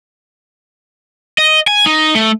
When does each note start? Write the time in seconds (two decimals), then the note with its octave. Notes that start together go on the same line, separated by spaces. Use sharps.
1.38 D#5
1.67 G#5
1.86 D#4
2.15 A3